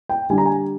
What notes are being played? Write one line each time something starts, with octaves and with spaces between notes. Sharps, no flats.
G5
D3 G3 G#5
A#5
G#5